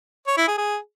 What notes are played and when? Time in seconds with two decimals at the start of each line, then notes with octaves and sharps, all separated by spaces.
0.27 C#5
0.37 E4
0.48 G#4
0.58 G#4